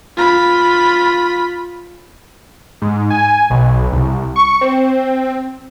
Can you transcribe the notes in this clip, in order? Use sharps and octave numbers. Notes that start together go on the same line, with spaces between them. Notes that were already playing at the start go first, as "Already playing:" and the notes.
F4 B5
G#2
G#5
B1
C2
C#6
C4